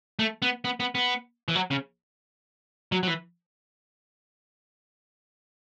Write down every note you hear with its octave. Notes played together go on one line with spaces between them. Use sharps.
A3
B3
B3
B3
B3
E3
F#3
C#3
F#3
F#3
E3